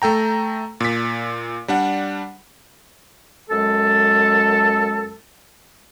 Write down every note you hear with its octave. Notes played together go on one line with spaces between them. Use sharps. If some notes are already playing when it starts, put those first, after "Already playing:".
A3 A4 G5 A#5
A#2 B6
G3 D4 F#5
F#2 G#3 A4